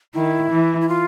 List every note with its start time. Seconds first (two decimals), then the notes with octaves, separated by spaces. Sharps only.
0.14 D#3 E4
0.51 E3
0.81 E4
0.89 F4